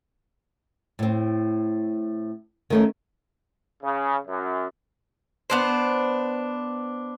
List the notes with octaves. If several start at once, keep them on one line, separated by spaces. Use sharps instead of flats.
A2 C4
D#3 A3 C#4
C#3
F#2
B3 D4 C5